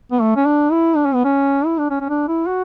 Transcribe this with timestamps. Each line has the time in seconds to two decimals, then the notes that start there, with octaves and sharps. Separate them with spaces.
0.12 B3
0.21 A3
0.37 C#4
0.46 D4
0.72 E4
0.96 D4
1.06 C#4
1.15 B3
1.25 C#4
1.66 E4
1.78 D4
1.91 C#4
2.01 C#4
2.09 D4
2.28 E4
2.48 F#4